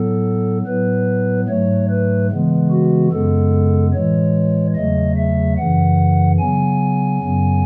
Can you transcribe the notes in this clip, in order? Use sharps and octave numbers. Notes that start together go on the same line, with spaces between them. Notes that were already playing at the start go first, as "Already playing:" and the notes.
Already playing: A2 F#3 B3 A4
A2 F#3 B3 B4
G#2 F#3 A3 C#5
B4
C#3 E3 G#3 B3
F#4
F#2 C#3 G#3 B3 A4
A2 E3 G#3 C#5
E2 C#3 F#3 A3 D#5
E5
F#2 C#3 E3 F#5
C#3 F#3 B3 G#5
F#2 C#3 F#3 B3